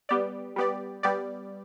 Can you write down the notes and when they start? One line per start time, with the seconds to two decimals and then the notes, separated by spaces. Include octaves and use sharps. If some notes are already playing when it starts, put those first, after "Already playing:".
0.09 G3 B3 G4 D5
0.56 G3 B3 G4 D5
1.03 G3 B3 G4 D5